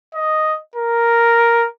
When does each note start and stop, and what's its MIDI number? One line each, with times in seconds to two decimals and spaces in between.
0.15 0.56 75
0.76 1.67 70